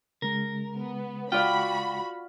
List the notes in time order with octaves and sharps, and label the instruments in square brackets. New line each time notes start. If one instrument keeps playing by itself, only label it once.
[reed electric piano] C#3 G#3 [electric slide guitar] A#4
[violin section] B3
[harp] F4 D5 F5 [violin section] F#4 B5 [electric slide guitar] G5